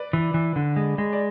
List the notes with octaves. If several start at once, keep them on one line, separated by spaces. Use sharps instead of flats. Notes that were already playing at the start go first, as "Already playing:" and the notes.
Already playing: B4 D5
E3
E3
D3
G#3
G#3
D5